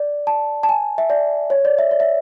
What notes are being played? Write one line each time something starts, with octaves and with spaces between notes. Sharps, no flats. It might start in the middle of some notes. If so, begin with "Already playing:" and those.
Already playing: D5
A5
A5
G#5
E5
D5
C#5
D5
E5
D5
E5